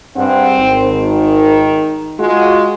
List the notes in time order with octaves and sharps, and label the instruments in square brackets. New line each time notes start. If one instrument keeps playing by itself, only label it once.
[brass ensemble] G2 G#4 F#5 [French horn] C4
[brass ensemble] G#1
[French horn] D#3
[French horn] G#3 [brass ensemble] F4 F#4